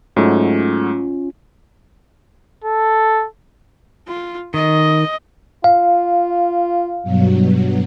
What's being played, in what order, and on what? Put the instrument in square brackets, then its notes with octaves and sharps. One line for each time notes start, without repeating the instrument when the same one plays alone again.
[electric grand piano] G#2 F#3 A3 [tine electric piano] C#4 F4
[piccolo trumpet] A4
[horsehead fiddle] F4
[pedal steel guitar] D#3 [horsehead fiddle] D#5
[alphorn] F4 [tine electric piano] F5
[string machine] G2 B2 F#3